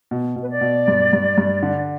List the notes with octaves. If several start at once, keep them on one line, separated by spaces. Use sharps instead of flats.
B2
B2
B4
D5
B2
G2
G2
G2
D3